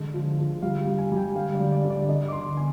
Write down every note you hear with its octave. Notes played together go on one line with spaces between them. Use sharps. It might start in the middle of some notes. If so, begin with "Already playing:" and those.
Already playing: D3 G#3
F3
D3
G3 F5
G3
G#5
G3 G5
D3 F5
D5
G3
D5
D3
D5
D3 D#5
D6
D3 C6
B3 G#5